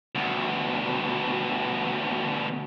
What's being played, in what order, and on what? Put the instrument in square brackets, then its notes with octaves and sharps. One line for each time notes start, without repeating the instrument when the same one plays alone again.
[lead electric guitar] D2 B2